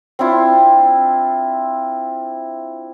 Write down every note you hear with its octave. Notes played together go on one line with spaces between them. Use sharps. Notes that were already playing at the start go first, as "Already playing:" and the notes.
C4 D4 E4 F4